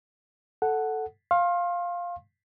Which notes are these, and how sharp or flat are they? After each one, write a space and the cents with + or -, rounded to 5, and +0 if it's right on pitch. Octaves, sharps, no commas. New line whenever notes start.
A4 +0 F#5 +0
F5 +0 C6 +35